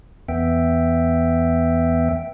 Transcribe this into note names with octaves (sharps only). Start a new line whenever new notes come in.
E2 B3 E5 G5